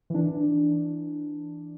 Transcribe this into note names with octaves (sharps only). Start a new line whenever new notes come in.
E3 D4